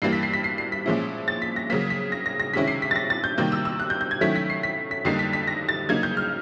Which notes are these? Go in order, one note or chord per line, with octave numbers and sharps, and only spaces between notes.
G2 E3 G3 A#3 C7
B6
C7
B6
C7
C7
B6
A#2 F3 G#3 C#4 E4
A6
B6
A#6
C#3 F#3 A#3 B6
B6
A#6
A#6
A#6
C3 D#3 G#3 C#4 E4 B6
C7
B6
A6
A#6
A6
G6
C3 D#3 G3 A#3 G6
E6
E6
F#6
G6
G6
G#6
D#3 F#3 A3 C#4 E4 B6
B6
C7
B6
B6
F2 D3 G3 A#3 D#4 C7
B6
B6
A#6
A6
C#3 F#3 A#3 D#4 G#6
G6
F6